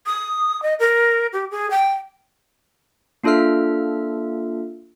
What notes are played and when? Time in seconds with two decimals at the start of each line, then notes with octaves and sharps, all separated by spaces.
0.06 D#6
0.62 D#5
0.80 A#4
1.33 G4
1.51 G#4
1.71 G5
3.24 A#3 D4 F4 A4 E5 F6